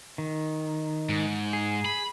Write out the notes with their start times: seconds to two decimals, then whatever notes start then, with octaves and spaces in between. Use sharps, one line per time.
0.18 D#3
1.09 G#2
1.53 G#4
1.85 B5